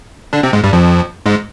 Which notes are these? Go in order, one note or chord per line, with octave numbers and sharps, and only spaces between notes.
D3 D4
C3 C4
G#2 G#3
G2 G3
F2 F3
G#2 G#3